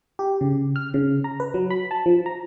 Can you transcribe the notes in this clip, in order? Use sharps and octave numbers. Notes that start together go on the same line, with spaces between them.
G4
C#3
F6
C#3
A#5
B4
F#3
B5
A5
F3
A#5